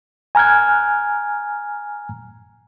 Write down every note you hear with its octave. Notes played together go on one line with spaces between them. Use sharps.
G#5 A#5 F6 F#6 G#6